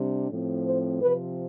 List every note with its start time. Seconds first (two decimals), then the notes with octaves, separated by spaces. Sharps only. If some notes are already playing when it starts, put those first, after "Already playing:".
Already playing: C3 G3 D4
0.30 A2 F3 C4
0.65 C5
1.02 C3 F3 C4 B4